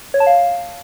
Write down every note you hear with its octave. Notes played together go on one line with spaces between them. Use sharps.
C#5
A5
F5